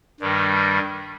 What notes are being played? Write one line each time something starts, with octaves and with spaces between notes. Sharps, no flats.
G2 D#3 G3